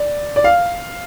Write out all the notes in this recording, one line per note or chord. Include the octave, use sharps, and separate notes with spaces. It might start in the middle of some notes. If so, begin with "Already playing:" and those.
Already playing: D5
D5
F5